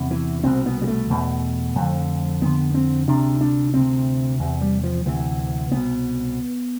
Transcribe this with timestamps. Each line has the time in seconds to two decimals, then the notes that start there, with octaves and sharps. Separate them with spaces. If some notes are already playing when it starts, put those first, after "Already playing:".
Already playing: E2 C3
0.11 E3
0.44 C2 B2 C4
0.66 B3
0.82 G3
0.87 A3
1.10 E2 B2
1.75 F2 D3
2.42 F2 D3 B3
2.75 C4
3.08 D2 C3 D4
3.41 D4
3.74 D2 C3 C4
4.39 E2 C3
4.61 G3
4.84 F3
5.05 D2 C3 E3
5.71 C2 B2 B3